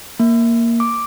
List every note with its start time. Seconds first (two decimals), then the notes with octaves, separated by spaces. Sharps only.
0.20 A#3
0.80 D6